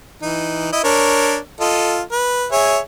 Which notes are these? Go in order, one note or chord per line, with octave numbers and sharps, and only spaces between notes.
E3 D#4
E4 D#5
D4 A#4 C#5
F4 A4 D#5
B4
G#4 C#5 E5